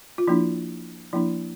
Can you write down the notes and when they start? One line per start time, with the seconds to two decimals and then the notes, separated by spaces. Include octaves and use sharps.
0.18 F4
0.28 F3 A#3 D4 E4
1.13 F3 A#3 D4 E4